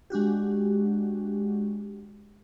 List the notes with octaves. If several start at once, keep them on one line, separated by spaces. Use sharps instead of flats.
G#3 D4 F#4 G4